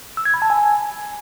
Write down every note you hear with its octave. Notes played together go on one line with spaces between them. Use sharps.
E6
G#6
B5
A5
G#5